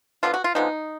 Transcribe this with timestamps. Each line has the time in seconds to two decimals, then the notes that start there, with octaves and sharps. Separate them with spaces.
0.23 D3 F3 G#3 B3 F4
0.34 F#4
0.44 F4
0.55 D3 F3 G#3 B3 D#4